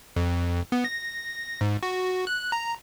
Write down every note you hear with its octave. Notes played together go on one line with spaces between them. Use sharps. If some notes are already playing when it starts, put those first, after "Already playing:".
F2
B3
A#6
G#2
F#4
F#6
A#5